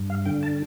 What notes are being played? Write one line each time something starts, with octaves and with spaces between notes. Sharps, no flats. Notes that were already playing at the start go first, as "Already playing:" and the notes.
Already playing: G2
F5
D3 G5
A5